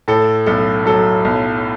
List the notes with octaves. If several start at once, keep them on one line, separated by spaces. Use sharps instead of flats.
A2 A4
B1 A4
F#3 A4
B1